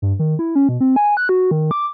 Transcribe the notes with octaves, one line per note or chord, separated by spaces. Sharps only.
G2
D#3
E4
C#4
B2
C4
G#5
F#6
F#4
D#3
D6